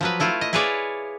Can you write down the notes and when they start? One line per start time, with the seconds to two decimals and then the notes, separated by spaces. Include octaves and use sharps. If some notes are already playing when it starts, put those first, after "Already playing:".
0.01 F3 F#3 B4
0.20 A3 E4 F4
0.41 D#5
0.53 E4 F4 G#4 B4 C#5 D5